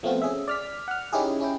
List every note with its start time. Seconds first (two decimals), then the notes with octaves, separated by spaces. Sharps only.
0.03 F3 A3 B3 C4 F4 F#4
0.22 C#4 G#4 E5
0.48 D5 F6 B6
0.88 F#5 F6
1.13 C#4 D#4 E4 G4 G#4
1.41 C#4 E4 G5